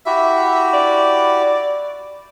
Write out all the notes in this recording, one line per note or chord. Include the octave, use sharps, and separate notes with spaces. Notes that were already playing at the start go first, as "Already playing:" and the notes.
E4 F#4 G4 E5
D5